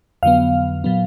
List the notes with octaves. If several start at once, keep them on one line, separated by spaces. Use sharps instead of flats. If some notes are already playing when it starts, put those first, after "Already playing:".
F2 D3 F#3 B3 F5
A#2 F#3 B3